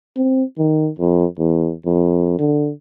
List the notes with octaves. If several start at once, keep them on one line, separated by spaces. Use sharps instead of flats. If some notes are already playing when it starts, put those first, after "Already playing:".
C4
D#3
F2
E2
F2
D3